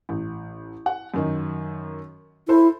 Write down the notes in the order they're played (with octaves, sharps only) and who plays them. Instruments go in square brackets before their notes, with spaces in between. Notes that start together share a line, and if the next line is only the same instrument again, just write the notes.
[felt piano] A1
F#5
F#2 D#3 D#4
[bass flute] E4 [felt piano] A4 C5